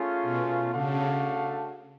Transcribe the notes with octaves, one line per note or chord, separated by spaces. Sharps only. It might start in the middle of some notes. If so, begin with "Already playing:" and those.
Already playing: A3 C#4 F4 G#4
B2
C#3 A3 D4 F#4 A4 F5